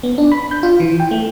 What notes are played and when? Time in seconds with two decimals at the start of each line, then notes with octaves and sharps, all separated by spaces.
0.03 B3
0.18 D4
0.32 B5
0.51 G6
0.63 F4
0.80 E3
1.00 G5
1.11 A3